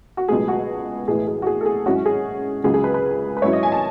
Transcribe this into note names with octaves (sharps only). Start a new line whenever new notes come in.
F#4
C#2 B2 F#3 A3 G#4
F#4
B1 A2 E3 B3 E4 G#4
G#4
F#4
G#4
A4
G#4
G#2 F#3 C#4 E4 F#4
G#4
C#2 C#3 F#3 G#4
G#4
B4
B4
B4
G#2 F#3 C#4 E4 C#5
D#5
G#5
A5